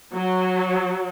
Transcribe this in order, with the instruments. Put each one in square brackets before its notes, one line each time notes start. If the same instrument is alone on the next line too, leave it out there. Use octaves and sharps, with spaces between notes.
[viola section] F#3